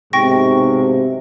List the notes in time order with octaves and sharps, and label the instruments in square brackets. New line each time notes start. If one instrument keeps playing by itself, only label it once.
[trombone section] B1 G#2 C3 [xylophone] G5 C#6 A#6